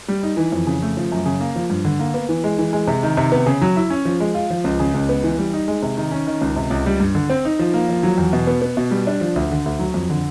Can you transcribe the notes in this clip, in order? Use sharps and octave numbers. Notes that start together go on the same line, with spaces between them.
G3
D#4
E3
F2
C#3
A3
F3
F#2
C#3
A#3
F3
G2
D3
A#3
B3
E3
G#3
E3
G#3
C3
D#3
C3
B3
C#3
F#3
E4
C#4
F3
G#3
F4
F3
C#2
C#3
C#2
B3
E3
G3
D#4
G#3
C3
D#3
C#4
D#3
C#2
C3
C#2
G3
G2
D3
C4
D#4
F3
A#3
F3
F#3
E2
B2
B3
B3
B2
G3
D4
F3
D2
D3
D2
F#3
F2
D3